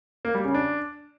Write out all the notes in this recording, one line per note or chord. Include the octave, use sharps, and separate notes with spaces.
A#3
G3
C#3
D4